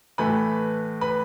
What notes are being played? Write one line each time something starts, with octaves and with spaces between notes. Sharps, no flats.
A2 E3 A3 B4 B5
B4 B5